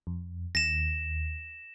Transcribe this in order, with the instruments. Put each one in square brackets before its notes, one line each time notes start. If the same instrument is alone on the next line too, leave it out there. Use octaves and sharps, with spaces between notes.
[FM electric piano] F2
[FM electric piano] D#2 [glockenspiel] A#6 E7